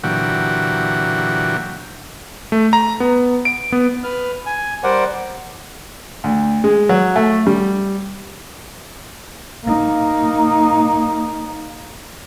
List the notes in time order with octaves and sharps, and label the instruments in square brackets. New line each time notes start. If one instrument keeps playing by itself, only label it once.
[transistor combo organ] A#2 D3 E3 F#3 F#4 G4
[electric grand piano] A3
A#5
B3
D7
B3
[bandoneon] B4 F6
G#5
G3 A#4 C5 D5 F#5
[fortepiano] D2
G#3
F#3
A3
G3
[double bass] A#3 D#4